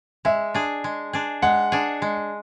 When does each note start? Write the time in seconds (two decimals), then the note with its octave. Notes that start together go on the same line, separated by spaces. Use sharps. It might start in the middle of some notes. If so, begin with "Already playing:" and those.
0.25 G#3 E5
0.54 D4 G#4
0.84 G#3
1.13 D4 G#4
1.42 G#3 F#5
1.72 D4 G#4
2.02 G#3